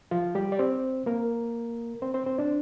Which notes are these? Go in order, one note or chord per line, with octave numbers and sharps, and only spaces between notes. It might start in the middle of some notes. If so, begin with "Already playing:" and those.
F3 F4
G3 G4
D5
C4 C5
A#3 A#4
C4 C5
C4 C5
C4 C5
D4 D5